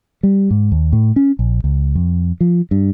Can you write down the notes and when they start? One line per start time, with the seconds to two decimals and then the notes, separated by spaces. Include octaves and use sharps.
0.23 G3
0.51 G#2
0.72 D#2
0.93 A2
1.16 C#4
1.39 A#1
1.64 C#2
1.95 F2
2.41 F3
2.71 G2